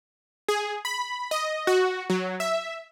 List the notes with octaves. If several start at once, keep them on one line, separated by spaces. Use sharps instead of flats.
G#4
B5
D#5
F#4
F#3
E5